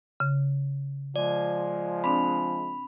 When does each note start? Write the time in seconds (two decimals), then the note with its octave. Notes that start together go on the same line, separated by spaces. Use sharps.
0.20 C#3
1.16 F3 G#3 D5
2.04 C4 D4 D5 B5